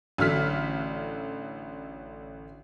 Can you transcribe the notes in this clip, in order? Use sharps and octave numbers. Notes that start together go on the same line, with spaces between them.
A1 D3 F#3 F6 B6